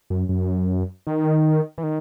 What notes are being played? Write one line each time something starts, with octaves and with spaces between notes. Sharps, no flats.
F#2
F#2
D#3
E3
D#3